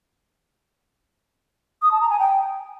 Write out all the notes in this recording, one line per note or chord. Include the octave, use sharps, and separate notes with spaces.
D#6
A5
A#5
G#5
G5